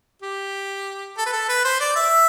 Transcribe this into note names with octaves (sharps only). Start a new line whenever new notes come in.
G4
A4
B4
A4
B4
C5
D5
E5